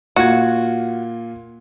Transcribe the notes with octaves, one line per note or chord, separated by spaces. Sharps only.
A#2 F4 F#4 G#6